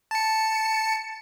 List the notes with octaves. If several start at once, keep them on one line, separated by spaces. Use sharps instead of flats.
A5 C#7